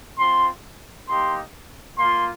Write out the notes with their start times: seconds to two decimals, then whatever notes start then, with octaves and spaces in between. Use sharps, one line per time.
0.19 C4 F4 C6
1.08 A#3 D#4 G4 C6
1.98 A#3 F4 C6